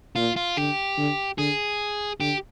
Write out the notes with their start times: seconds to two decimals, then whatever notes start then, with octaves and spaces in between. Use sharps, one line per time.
0.16 A#2 F4
0.36 F4
0.57 D3 G4
0.97 D3
1.38 D3 G#4
2.20 D3 G4